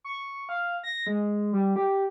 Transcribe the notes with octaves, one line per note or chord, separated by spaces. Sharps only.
C#6
F5
A#6
G#3
G3
G4